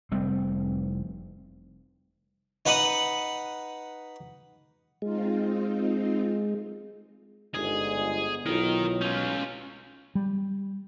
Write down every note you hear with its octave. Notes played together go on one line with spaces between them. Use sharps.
F1 G3 A3 C4
D#4 B4 F#5 B5 D#6
G#3 C4 D#4 F4
G1 G#2 G#4
B1 E4 F4 A#4 C#5 D#5
C#4 F4 G6
G3